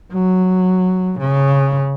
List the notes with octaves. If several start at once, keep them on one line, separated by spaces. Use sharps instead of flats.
F#3
C#3